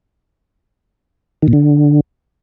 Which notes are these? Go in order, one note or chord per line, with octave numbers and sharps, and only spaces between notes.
D#3
A#2
D3